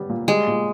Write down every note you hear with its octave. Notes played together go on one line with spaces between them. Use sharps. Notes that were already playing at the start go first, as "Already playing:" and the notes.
Already playing: G3 B3
A#2
G3 G#3
A#2